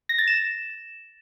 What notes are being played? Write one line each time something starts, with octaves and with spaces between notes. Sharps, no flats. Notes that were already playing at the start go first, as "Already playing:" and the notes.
A#6
A6
E7